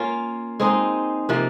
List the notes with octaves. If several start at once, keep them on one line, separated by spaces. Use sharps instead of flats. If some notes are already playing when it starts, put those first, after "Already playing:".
Already playing: A#3 C#4 F4
G#3 C4 D#4
C3 F3 A#3